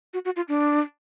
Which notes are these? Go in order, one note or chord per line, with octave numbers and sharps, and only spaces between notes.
F#4
F#4
F4
D4